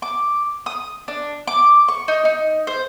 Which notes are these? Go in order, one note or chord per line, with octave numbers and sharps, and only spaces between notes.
D6
D#6
D4
D6
C#6
D#4
D#4
C5